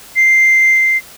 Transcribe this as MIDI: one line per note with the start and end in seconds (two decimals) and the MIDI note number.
0.16 0.97 96